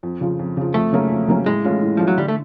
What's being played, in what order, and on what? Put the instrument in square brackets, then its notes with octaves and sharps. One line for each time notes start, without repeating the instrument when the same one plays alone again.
[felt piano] F2
C#3 F3
F2
C#3 F3
[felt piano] F2 [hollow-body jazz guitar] A3
[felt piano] C#3 F#3 A#3 C#4
F2
C#3 F#3 A#3 C#4
[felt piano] A2 [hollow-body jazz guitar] G#3
[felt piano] E3 A3 C#4 F4
A2
[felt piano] E3 A3 C#4 F4 [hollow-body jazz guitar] F3
[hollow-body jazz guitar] F#3
[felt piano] D3 [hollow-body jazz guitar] G3
[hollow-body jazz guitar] A3